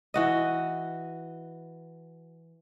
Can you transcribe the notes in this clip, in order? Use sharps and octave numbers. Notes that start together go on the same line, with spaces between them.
E3 F#4 D#5